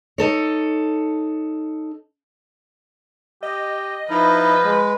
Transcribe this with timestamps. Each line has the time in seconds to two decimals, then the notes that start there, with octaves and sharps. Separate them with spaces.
0.18 D#4 A4 C#5
3.43 G4 D#5
4.10 F3 D#4 E4 B4
4.64 G#3